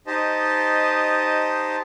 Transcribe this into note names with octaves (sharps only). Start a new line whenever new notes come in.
D#4 G4 C5 D#5 A5